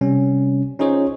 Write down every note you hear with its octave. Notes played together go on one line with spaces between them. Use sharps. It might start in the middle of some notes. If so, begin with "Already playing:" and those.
C3 G3 C#4
C#4 D#4 F4 G#4 C5 C#5